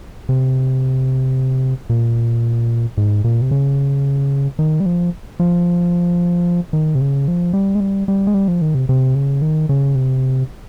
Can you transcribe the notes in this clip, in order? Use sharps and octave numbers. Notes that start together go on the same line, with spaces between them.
C3
A#2
G#2
A#2
C3
C#3
D#3
G3
F3
F3
D#3
C3
C#3
F3
G3
G#3
G3
G3
G#3
G3
F3
D#3
C3
C3
C#3
D#3
C#3
C3